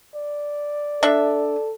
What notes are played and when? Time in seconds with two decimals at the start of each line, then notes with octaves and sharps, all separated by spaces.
0.15 D5
1.03 D4 A4 E5